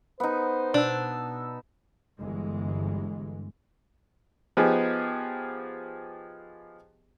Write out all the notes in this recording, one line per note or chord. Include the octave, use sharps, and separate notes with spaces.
B3 D#4 C5
B2 D4 A5 E6
G1 E3 G#3
F3 B3 D#4 G4 G#4